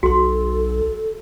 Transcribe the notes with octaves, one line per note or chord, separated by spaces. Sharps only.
B1 F#4 A4 C6